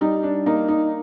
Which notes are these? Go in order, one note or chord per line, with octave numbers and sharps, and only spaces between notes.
G3 D#4
D4
A#3 D#4
D#4